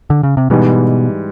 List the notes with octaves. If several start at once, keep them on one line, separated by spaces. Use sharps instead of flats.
D3
C#3
C3
G#2 B2 E3 G3